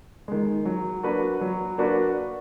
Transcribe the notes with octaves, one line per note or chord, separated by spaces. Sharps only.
D#3 G#3
F#3
A#3 D4 F#4 B4
F#3
A#3 D4 F#4 B4